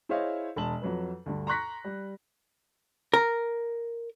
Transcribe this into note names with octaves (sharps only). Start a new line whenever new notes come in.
E4 G#4 C5 C#5 D#5 F5
E1 A5 F#7
F2 F#3 B4
D2 G2
A#5 C6 C#6 F#6 A#6 B6
G3
A#4